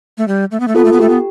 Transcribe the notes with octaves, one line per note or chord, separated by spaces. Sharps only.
A3
G3
A3
B3
A3
B3 F4 A4
A3
B3
A3 G4
B3